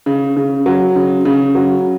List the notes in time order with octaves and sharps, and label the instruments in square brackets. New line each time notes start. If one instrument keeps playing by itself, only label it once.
[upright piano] C#3
C#3
F#3
C#3
C#3
F#3